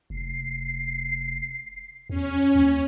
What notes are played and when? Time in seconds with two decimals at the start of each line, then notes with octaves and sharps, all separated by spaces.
0.10 F1 C7
2.10 E2 C#4
2.55 D#2